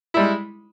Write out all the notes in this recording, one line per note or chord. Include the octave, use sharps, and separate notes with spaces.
G3 G#3 E4